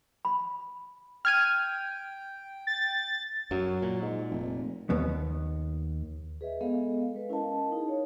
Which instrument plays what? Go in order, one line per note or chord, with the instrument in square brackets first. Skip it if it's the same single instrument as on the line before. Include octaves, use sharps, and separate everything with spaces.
[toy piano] B5
[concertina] G5 [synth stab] F6 G#6 D#7
[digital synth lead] A6
[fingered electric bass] F#2 [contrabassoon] F#3
[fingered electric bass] A#2
[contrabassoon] G#2
F1
[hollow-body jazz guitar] D#2 B3
[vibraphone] G#4 B4 D#5 E5
G#3 B3 G#4 A4 D#5 F5
G#3 B4
C#4 E4 A#4 D#5 F5 A5
D#4 G#4
C#5